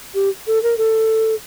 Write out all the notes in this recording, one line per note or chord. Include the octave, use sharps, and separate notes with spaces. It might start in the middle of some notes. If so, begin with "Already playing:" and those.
G4
A4
A#4
A4